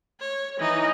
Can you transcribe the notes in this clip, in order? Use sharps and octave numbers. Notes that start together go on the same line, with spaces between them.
C#5
E3 D#4